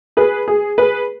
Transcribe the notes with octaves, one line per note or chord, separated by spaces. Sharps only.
G#4 B4
G#4
G#4 B4